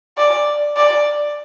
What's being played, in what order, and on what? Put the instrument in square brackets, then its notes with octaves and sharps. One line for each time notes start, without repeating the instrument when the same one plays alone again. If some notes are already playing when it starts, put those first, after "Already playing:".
[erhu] D5
D5